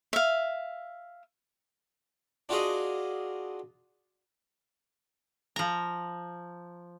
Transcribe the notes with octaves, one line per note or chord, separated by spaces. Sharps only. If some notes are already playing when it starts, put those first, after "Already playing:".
E5 F5
D4 F4 F#4 G#4 D#5
F3 A#5